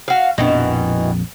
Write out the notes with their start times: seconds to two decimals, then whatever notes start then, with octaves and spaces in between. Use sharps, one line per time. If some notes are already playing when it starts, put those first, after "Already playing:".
0.08 F#4 F5
0.38 A#1 F2 B2 D#3 E3 D4